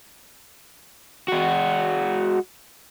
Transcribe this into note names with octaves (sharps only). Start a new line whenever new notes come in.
G#3 F#4